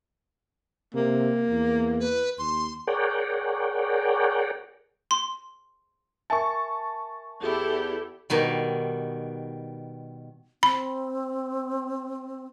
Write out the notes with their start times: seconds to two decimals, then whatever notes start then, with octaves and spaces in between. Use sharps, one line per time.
0.94 C3 A#3
1.50 E2
2.00 B4
2.38 D#2 C6
2.87 G#4 A#4 C#5 D5 F#5 G5
5.11 C6
6.30 A#4 E5 G#5 A5 C#6
7.42 E2 E4 G4 A4
8.30 B2 D#3 G3
10.63 C4 B5